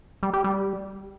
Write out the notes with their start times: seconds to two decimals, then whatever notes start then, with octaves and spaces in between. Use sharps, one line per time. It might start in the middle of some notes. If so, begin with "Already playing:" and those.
0.23 G3
0.33 G4
0.44 G3